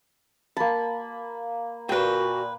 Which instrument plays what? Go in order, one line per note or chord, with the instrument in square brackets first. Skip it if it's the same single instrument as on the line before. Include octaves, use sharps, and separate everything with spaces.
[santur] A#3 B5 [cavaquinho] A5
[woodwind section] A#2 [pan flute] F#4 [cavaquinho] B4 G5